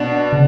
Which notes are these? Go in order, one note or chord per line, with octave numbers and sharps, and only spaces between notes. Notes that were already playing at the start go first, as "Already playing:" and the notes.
Already playing: B2 D4
C#3